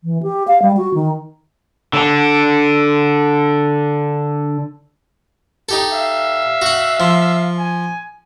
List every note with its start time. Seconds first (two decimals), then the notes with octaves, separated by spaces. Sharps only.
0.04 E3
0.23 G4
0.48 F5
0.62 G3
0.77 F#4
0.94 D#3
1.93 D3 D4
5.69 D#4 G4 A4
5.91 E5 F5
6.62 F#4 F#5
7.00 F3
7.58 G#5